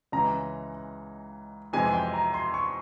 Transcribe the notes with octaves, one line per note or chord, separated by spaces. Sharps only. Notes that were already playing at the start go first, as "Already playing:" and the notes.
C#2 C#3 E3 G#3 A#5
F2 C3 E3 G#3 G#5
G5
A#5
C6
C#6